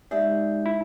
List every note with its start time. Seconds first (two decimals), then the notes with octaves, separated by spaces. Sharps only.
0.11 G#3 D#4 G4 D5 E5
0.66 E4